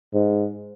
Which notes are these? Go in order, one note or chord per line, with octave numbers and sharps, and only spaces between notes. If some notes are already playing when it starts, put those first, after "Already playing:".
G#2